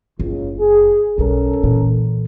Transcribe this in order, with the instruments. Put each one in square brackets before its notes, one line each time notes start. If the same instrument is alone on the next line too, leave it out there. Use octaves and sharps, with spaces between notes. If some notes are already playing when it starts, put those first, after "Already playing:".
[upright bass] F#1 [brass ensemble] C#2
[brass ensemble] G#4
[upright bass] B1 G3 [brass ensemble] C#4 A4 A#4
[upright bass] A#2 E3